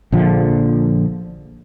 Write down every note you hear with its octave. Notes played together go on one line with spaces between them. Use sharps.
A#1 D3 F3